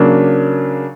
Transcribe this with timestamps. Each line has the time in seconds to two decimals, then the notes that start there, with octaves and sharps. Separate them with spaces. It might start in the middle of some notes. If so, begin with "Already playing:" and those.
Already playing: C#3 F#3 A#3 D4